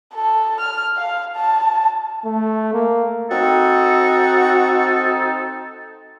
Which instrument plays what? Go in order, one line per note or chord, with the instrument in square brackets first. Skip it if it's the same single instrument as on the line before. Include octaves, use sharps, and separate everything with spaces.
[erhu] A4
F6
F5
A5
[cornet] A3
A#3
[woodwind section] C4 D#4 A4 [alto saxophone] F#4